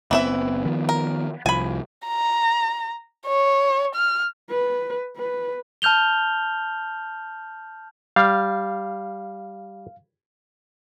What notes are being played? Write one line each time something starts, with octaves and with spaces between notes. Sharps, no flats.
F#1 E3 B3 C4 E4 E5
D#3 F3 B3
A#4
C2 F3 G#5 B5
A#5
C#5
F6
B4
B4
A5 F6 G6 F7 G7
G3 F5